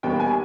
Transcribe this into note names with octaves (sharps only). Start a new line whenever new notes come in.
D#2 D#3 G3 B3 G5
G#5